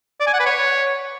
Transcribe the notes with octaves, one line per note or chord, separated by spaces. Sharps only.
D5
G#5
F#5
B4
C#5